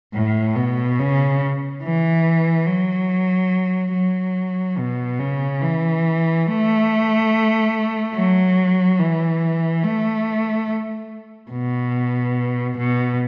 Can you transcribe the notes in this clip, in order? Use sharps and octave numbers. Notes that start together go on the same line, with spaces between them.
A2
B2
C#3
E3
F#3
F#3
B2
C#3
E3
A3
F#3
E3
A3
B2
B2